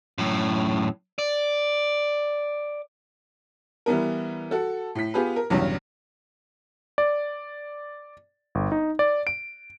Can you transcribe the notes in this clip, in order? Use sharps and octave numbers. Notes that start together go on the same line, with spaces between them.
F#2 A2
D5
E3 G3 B3 A#4
F#4 A4
A2 B6
B3 F4 G4 G#4 B4
A#4
B1 E2 G2 C#3
D5
G1
D#4
D5
D7